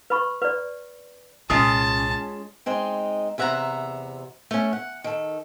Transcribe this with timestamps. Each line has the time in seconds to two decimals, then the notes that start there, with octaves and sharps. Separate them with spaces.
0.10 B4 B5 C#6
0.42 B4 D5
1.50 C2 A#2 G#3 C#4 F4 A5 D#6
2.66 G#3 C4 D#4
3.38 E2 C3 E5 F#5 G#5 A#5
4.51 A3 C#4
4.73 F#5
5.04 D#3 A4